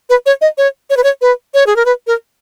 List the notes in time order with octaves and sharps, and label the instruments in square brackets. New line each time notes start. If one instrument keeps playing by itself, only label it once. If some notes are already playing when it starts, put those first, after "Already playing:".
[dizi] B4
C#5
D#5
C#5
C#5
B4
C#5
B4
C#5
G#4
A#4
B4
A#4